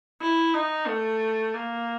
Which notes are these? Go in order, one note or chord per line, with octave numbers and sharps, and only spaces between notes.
E4
D#4
A3
A#3